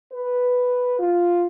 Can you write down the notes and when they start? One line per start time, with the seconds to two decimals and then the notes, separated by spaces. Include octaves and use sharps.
0.13 B4
0.99 F4